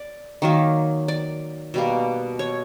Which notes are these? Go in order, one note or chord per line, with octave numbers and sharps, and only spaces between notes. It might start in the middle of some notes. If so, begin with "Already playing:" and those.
Already playing: D5
D#3 F#3 A#3
D5
B2 G3 A#3
C#5